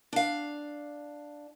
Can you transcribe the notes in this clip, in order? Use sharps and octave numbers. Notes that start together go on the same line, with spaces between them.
D4 F5